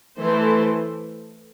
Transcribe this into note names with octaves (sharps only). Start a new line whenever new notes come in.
E3 A3 E4 A4 C5